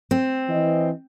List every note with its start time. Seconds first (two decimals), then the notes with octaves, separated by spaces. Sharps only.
0.11 C4
0.49 E3 D#5